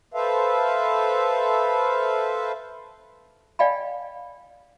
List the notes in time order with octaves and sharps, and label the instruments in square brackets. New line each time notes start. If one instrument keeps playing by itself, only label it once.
[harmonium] A4 B4 C5 E5 F5
[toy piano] D5 D#5 F5 G5 G#5 B5